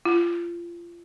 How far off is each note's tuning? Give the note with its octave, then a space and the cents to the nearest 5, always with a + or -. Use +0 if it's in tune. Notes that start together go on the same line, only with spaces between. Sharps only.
F4 -25